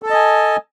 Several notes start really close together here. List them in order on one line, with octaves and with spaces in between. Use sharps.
A4 A5 D#5 G#5